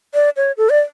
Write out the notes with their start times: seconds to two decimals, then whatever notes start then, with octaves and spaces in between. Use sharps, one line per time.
0.14 D5
0.37 C#5
0.57 A4
0.70 D5